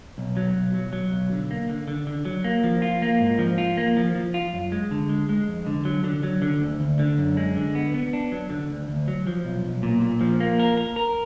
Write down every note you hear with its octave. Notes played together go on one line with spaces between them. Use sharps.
B1
F#3
B1
F#3
F#3
B1
D3
A#3
D3
D3
D3
F#3
A#3
F3
F4
A#3
G#2
F3
F4
A#3
F3
F3
F4
F#2
G#3
D3
G#3
G#3
F2
D3
F#3
D3
F#3
D3
D2
D2
D3
F#2
G#3
D3
B3
B3
D4
F#3
D3
D2
D2
F#3
F3
B1
B1
A#2
A#2
F3
A#3
A#4
A#4
A#4